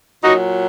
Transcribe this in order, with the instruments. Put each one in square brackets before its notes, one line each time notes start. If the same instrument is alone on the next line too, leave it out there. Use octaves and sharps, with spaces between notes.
[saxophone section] A#2 F#3 D#4 F#4